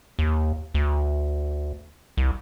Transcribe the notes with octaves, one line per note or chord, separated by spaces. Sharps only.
D#2
D2
C2